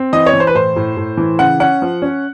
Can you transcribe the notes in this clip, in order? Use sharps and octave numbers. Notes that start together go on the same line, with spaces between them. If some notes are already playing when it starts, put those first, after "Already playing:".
Already playing: C4
E3 D#5
C#5
E3
C5
B4
A2 C5
A2
A2
E3
C#3 F#5
C#4 F#5
F3
C#4